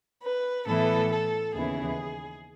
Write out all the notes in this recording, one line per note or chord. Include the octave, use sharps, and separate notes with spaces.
B4
A2 E3 B3 E4 A4
A4
D#2 C#3 E3 B3 E4 G#4